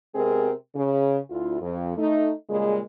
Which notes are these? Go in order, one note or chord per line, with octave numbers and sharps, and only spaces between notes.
C3 G#3 B3 C4 G#4 A#4
C#3
D2 E4 F4
F2
A3 D#4
A#2 C#3 G3 G#3